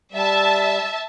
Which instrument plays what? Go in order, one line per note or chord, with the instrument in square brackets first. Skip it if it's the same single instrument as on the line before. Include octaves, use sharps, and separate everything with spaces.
[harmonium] G3 [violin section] E5 A5